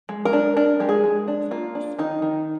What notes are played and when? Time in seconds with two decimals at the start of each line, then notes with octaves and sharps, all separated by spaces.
0.09 G#3
0.25 A#4
0.33 D4
0.57 D4 A#4
0.80 G#3 G4
0.89 G#4
1.04 G#3
1.28 D4
1.51 A#3 F4
1.75 D4
1.99 D#3 D#4
2.22 D#3